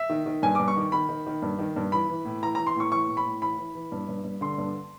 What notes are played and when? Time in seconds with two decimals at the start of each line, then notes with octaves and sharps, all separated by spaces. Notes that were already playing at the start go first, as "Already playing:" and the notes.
Already playing: E5
0.10 D#3
0.26 D#3
0.43 G2 G#5
0.55 G2 D6
0.68 C#6
0.76 D#3
0.92 D#3 B5
1.09 D#3
1.27 D#3
1.42 G2
1.59 D#3
1.76 G2
1.92 E3 B5
2.09 E3
2.25 A2
2.43 E3 A#5
2.55 E3 A#5
2.67 C6
2.76 A2 C#6
2.92 E3 C#6
3.08 A2
3.17 B5
3.25 A2
3.42 E3 B5
3.58 E3
3.75 E3
3.92 G2
4.09 G2
4.24 G2
4.41 D3 C6
4.58 G2